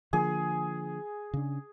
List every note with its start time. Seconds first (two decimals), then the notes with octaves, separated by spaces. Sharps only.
0.13 D3 F3 A#3 G#4
1.34 C#3 D4